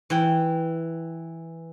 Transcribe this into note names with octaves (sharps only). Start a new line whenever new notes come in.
E3 G5